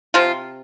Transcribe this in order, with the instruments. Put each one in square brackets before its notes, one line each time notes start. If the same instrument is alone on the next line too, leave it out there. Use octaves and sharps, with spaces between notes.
[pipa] C3 F3 F4